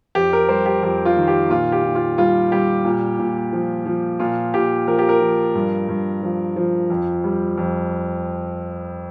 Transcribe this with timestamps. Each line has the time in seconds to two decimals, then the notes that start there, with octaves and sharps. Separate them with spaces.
0.15 F2 G4
0.33 A#4
0.49 G3 C5
0.66 G4
0.83 F2 G4
1.05 F4
1.17 D#3
1.28 G4
1.50 A#2 F4
1.72 G4
1.84 A#2
1.95 F4
2.18 G3 F4
2.52 G3 G4
2.85 A#2
3.19 A#2
3.53 F3
3.86 F3
4.20 A#2 F4
4.54 A#2 G4
4.87 F3 A#4
4.99 G4
5.09 A#4
5.21 F3
5.55 G2
5.89 G2
6.23 F3
6.56 F3
6.90 F2
7.24 G3
7.57 F2